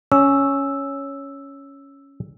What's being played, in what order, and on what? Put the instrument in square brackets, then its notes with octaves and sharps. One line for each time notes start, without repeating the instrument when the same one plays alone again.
[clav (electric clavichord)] C#4 [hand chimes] E6